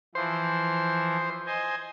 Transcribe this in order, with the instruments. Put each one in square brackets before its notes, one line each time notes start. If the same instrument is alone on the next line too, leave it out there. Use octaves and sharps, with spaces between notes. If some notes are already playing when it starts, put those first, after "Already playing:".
[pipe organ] E3 F3 [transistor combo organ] C5
[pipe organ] C5 D#5 G#5